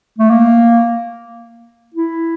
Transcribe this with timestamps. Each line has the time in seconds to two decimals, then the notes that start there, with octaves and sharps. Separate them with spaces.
0.18 A3
0.31 A#3
1.95 E4